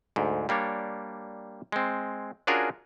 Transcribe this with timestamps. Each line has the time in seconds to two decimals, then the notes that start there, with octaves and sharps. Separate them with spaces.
0.16 D2 G#2
0.49 G3 A#3 D4 C#5
1.72 G#3 C4
2.47 C#4 D4 F4 F#4 G#4 A#4